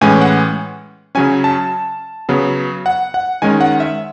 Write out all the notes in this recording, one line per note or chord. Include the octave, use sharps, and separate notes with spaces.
A2 E3 G#3 C#4 G#5
F#5
C#3 F#3 C#4 G#5
A5
C#3 F#3 B3
F#5
F#5
D#3 G#3 C#4 G#5
F#5
E5